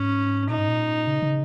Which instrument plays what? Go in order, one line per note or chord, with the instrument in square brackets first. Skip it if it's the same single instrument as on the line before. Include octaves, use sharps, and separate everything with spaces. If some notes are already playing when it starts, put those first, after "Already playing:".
Already playing: [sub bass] G#2 [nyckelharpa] C#4
[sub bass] A#2 [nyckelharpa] D#4
[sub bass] G#2
A#2
C#3
C#3